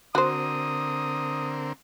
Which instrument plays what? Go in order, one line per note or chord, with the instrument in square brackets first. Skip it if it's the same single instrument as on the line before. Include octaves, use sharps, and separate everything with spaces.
[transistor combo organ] D3 C4 A#4 [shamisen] F#4 C5 [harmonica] D#6